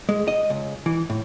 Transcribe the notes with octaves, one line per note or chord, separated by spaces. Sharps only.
G#3
D#5
C#2
E3
A2